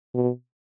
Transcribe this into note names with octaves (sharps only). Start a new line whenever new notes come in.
B2